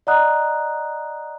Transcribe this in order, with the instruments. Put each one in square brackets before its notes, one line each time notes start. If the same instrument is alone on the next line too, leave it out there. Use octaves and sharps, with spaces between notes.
[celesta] D5 D#5 F#5 A#5 D#6 F#6